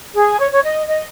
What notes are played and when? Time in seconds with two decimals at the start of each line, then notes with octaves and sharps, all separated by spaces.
0.15 G#4
0.38 C#5
0.51 C#5
0.63 D#5
0.87 D#5